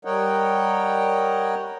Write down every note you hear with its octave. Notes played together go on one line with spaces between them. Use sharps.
G3 A#4 C#5 D#5 F#5 G5